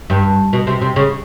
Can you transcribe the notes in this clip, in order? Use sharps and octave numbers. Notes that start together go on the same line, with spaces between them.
G2
B2
C3
C3
C#3